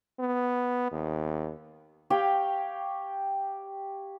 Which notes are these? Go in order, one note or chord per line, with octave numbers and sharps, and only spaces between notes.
B3
D#2
G4 C#5 F5 G5